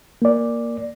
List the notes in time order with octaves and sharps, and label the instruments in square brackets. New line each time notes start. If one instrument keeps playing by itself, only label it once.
[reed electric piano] A#3 D5